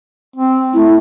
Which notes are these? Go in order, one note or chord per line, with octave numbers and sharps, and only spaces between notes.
C4
A3 E4